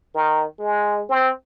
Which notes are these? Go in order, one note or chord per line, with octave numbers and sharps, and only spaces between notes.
D#3
G#3
C4